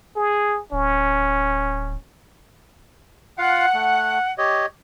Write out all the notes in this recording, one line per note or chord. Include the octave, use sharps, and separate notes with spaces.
G#4
D1 C#4
F4 F5 F#5
A3
G4 C#5 D#5